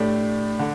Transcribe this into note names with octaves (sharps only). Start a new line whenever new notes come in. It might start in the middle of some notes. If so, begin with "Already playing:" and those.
Already playing: A2 A3 D4 G4
D3